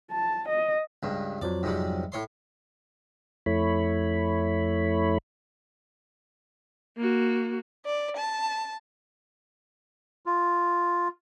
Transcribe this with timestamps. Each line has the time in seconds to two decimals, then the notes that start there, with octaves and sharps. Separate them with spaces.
0.12 A5
0.49 D#5
1.03 C#2 G2
1.42 F2 F3 F#3 D5
1.63 G#2 C3 G3
2.12 A2 C#5 C6
3.46 F2 A3 E4 C#5 B5
6.97 A#3 F#4
7.85 D5
8.17 A5
10.26 F4